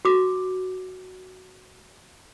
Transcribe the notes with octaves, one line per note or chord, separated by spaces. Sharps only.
F#4 D6